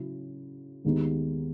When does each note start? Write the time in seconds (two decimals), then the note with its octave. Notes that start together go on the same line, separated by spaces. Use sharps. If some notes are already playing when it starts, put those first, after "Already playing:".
Already playing: C#3 F#3 C#4 E4
0.85 D#2 D#3 G#3 B3 D#4